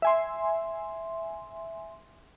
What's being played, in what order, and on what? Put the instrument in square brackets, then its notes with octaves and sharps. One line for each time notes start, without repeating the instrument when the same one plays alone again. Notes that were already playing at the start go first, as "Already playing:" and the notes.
[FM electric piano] E5 G#5 C6